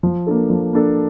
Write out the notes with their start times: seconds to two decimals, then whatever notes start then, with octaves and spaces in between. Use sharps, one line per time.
0.03 F3
0.27 A#3 D4 A4
0.50 F3
0.73 A#3 D4 A4